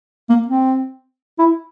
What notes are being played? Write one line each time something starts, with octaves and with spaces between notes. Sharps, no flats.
A#3
C4
E4